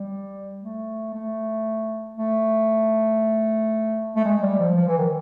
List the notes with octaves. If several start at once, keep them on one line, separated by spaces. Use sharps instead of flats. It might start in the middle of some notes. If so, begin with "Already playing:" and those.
Already playing: G3
A3
A3
A3
A3
G#3
G3
F3
F3
E3
D#3